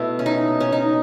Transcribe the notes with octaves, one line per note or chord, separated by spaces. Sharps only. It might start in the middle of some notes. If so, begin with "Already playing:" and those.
Already playing: B2 A3 E4
C#4
D#4
C#4
D#4